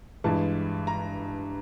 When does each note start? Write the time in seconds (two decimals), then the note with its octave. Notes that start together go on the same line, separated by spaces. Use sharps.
0.24 G2 E3 G#3 A5
0.87 A#5